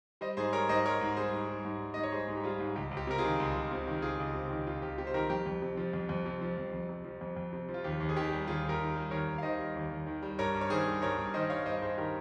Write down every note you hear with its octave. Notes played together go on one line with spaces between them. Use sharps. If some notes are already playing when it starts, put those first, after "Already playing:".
G3 C5 D#5
G#2 G#4 C5
G3 A#4 C#5
G#2 C5 D#5
G3 A#4 C#5
G#2
G3 G#4 C5
G#2
G3
G#2
G3
G#2 D#5
C#5
G3 G#4 C5
G#2
G4
G3 F4 G#4
G#2
C#2 G4
C#2
G4
C3 A#4
F4 G#4
D#3
C#2
C#2
C3
D#3
C#2 F4 G#4
C#2
C3
D#3
C#2 F4
C#2 G4
C3 G4
C5
D#3 G4 A#4
F2 G4
F2
C3
F3
F2
F2
C3
F3
F2
F2
C3
F3
F2
F2
C3
F3
F4
D#2 G4
D#2
G#4
D#3 G4
G3
D#2 F4 G#4
D#2
G4 A#4
D#3
G3
D#2 A#4 C#5
D#2
F5
D#3 C5 D#5
G3
D#2
D#2
D#3
G3
G2 A#4 C#5
G2
C#5
D#3 G#4 C5
G3
G2 A#4 C#5
G2
D#3 C5 D#5
G3 C#5 F5
G2 C5 D#5
G2 G#4 C5
D#3 G4 A#4